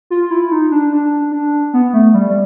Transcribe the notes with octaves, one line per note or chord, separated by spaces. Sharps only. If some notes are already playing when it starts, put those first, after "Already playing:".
F4
E4
D#4
D4
D4
D4
B3
A3
G3
G3